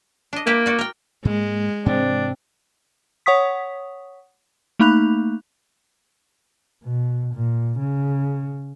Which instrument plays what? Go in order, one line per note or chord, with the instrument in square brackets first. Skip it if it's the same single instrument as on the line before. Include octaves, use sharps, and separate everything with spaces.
[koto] D4 D#5
[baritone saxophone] A#3 [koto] E4 G4 B4
[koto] F#4 D5
A#4 G5
[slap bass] G#2 A#3 [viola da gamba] G#3
[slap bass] G#2 C3 E3 [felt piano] C4 C5 [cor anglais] D4
[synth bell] C#5 F#5 C#6 D#6 B6
A3 A#3 D#4 B5 F#6 F7
[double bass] B2
A#2
C#3